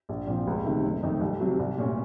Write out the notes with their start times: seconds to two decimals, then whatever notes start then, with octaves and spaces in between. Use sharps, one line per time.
0.09 A#1
0.27 A#2 F3 C4 F4
0.47 C#2
0.65 C3 D#3 A3
0.85 F#1
1.03 F2 D#3 A3 D#4
1.21 C2
1.40 C3 F#3
1.59 C2
1.78 A#2 A3 C#4